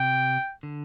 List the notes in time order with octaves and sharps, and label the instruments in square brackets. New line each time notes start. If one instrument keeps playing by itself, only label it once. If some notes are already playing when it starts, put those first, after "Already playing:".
Already playing: [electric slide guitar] C3 [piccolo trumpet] G5
[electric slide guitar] D3